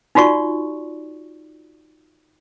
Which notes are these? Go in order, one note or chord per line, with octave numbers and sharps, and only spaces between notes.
D#4 F4 F#4 D5 C#6